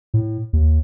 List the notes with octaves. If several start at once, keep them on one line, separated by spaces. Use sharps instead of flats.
A2
D#2